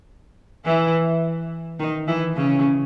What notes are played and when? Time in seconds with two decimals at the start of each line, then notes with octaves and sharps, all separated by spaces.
0.65 E3 E4
1.79 D#3 D#4
2.07 E3 E4
2.36 C#3 C#4